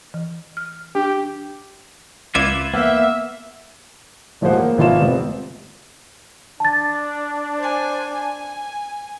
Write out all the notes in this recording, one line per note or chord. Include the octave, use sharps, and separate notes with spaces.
E3
F6
D4 G4
C#2 F4 B4 E5 D6 G#6
A#3 B3 E5
D#1 A1 F3 G#3 C5 F#5
A#3
G#1 E3 F3 F4 E5 E7
F1 B3 C4
D4 A5 A6
C5 G#5
G#5